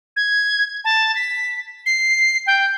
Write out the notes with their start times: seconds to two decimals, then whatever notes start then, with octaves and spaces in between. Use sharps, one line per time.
0.16 G#6
0.85 A5
1.15 B6
1.86 C7
2.47 G5